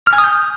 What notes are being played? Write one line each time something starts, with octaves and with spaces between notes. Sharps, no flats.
F6
G#5
D#6
G6